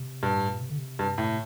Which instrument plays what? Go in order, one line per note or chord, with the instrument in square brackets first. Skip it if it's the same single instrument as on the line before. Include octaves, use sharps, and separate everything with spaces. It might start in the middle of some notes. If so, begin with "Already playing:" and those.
Already playing: [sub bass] C3
[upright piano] G2 [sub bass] A#2
[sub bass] A2
A#2
C3
D3
C3
[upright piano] G2
A2